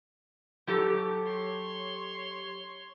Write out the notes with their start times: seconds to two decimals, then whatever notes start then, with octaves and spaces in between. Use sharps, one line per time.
0.67 F#3 G4 A4
1.23 C#5 C6